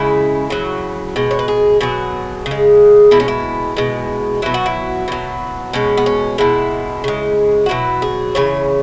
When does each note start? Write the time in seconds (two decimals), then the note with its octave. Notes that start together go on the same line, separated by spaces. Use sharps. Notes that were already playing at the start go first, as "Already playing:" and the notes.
Already playing: C#3 G#3 E4
0.50 C#3 F#3
1.16 B2 G#3
1.31 C#5
1.39 B4
1.48 G#4
1.81 B2 F#3 G#4
2.46 C#3
2.51 G#3
3.11 B2 G#3 E4
3.20 C#4
3.28 E4
3.77 B2 G#3
4.42 B2 F#3 E4
4.54 F#4
4.66 E4
5.08 B2 F#3
5.73 B2 G#3 C#4
5.97 B3
6.06 C#4
6.38 B2 G#3 E4
7.04 C#3 G#3
7.66 F#4
7.69 B2 F#3 E4
8.02 G#4
8.35 C#3 E3 C#5